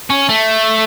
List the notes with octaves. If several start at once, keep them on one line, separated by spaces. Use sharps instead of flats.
C#4
A3